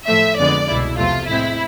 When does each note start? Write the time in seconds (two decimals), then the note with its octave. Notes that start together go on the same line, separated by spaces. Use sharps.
0.08 A2 F3 A3 E5
0.38 F2 D3 G#3 B3 D5
0.68 C2 B2 G#3 E4
0.98 E2 C3 F3 A3 F4
1.28 A2 G#3 C4 E4